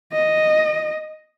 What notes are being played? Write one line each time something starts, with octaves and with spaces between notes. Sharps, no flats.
D#5